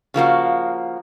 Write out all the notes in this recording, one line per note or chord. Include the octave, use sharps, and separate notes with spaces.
C#3 F3 A#3 F#4